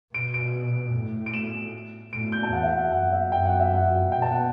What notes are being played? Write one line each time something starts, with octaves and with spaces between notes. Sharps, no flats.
B2 D7
D7
A2
D7
E7
A2 D7
G6
A5
E2 F#5
E5
F#5
F#2 F#5
E5
F#2 G5
F#5
E5
F#5
B2 G5
A5
F#5